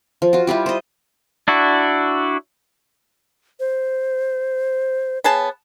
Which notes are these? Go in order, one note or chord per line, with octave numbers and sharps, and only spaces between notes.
F3
F4 F#4
G3 E4 F4 G4
C5 D#5
D4 E4 F#4
C5
B3 G#4 C#5 A5